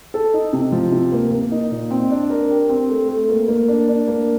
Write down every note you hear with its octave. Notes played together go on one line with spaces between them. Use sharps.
A4
D#4
C3
F3
C3
A#3
A#3
D#4
A#2
C4
D4
A#4
G4
C4
A3
A3
A#3
A#3
D4
D4
A#3